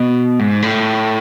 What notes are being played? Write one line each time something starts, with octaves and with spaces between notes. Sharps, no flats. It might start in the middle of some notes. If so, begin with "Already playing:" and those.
Already playing: B2
G#2
A2